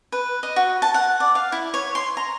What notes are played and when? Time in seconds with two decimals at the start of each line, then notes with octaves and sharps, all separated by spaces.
0.12 B4
0.43 D#5
0.56 F#4
0.82 A5
0.94 F#5
1.20 D5
1.35 F5
1.52 E4
1.74 C#5
1.95 C6
2.17 A#5